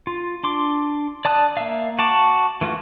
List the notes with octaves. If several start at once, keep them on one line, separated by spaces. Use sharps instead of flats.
F4
D4 C6 D6
D5 A5 D#6 F#6
A#3 E5 F5
F#4 A5 D6
E3 A3 F4 F#4